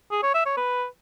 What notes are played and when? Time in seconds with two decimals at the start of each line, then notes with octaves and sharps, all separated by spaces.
0.11 G#4
0.23 C#5
0.34 E5
0.46 C#5
0.57 B4